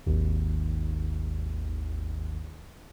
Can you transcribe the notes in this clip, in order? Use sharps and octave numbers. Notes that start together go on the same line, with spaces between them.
G#1 D#2